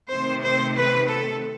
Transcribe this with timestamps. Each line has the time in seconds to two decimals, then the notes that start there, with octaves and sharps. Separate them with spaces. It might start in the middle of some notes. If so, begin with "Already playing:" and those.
0.10 C3 D#3 A3 C4 C5
0.43 C5
0.77 B4
1.11 A4